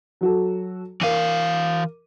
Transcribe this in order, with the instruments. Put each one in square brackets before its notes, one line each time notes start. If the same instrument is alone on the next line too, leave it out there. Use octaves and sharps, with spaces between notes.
[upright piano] F#3 F#4 A4
[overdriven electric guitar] E3 F5 [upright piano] A#4 D6 D#7